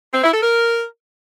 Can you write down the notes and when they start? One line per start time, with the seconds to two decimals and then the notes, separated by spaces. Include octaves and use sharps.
0.14 C4
0.23 E4
0.33 A4
0.42 A#4